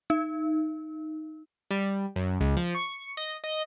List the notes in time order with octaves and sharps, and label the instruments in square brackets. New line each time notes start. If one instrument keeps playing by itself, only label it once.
[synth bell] D#4
[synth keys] G3
F#2
C#2
F3
C#6
D#5
D#5